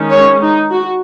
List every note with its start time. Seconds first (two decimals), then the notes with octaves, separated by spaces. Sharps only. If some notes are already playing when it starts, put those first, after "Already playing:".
Already playing: D#3 G#3 C#4
0.11 C#5
0.41 D#4
0.71 F#4